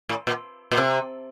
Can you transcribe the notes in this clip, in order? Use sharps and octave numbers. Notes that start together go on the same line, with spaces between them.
A2
A#2
A#2
C3